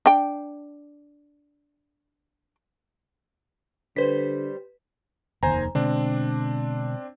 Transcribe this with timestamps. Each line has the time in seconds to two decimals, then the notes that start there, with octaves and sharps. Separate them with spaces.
0.06 D4 G5
3.96 D3 G3 B4 C5 B6
5.43 F1 D#2 D#3 C5 G#5 A#5
5.75 B2 D3 G#3 C4 D4